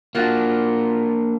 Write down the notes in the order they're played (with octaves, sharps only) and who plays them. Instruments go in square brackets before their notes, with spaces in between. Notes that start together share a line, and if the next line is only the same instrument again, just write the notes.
[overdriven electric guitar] A#3 D4 [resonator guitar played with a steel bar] F4 F#4